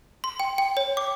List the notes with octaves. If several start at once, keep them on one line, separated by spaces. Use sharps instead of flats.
C6
G5
G5
C#5
D6